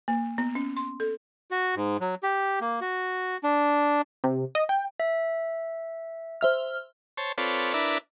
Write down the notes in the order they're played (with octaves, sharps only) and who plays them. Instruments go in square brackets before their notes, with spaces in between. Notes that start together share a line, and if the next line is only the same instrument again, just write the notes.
[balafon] A#3
B3
C#4
C6
A4
[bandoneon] F#4
G#2
F#3
G4
A#3
F#4
D4
[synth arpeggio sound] C3
D#5
G5
[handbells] E5
[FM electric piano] C5 E5 F6
[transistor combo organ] C5 C#5 A5
C4 F4 A4 B4 C#5 D5
D4 E4 A#4 B4 D5 E5